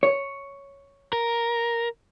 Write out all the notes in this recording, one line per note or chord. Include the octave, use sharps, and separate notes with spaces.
C#5
A#4